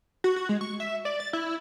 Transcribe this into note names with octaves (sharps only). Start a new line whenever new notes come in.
F#4
F#4
G#3
C#6
E5
D5
A6
E4